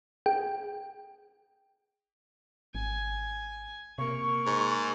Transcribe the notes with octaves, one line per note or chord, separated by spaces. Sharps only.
G#4 G5
G#1 G#5
C3 A#3 C#6
G#2